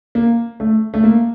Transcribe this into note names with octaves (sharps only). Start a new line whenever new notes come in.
A#3
A3
A3
A#3